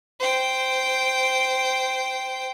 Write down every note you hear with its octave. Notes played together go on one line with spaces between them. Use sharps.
C5 G5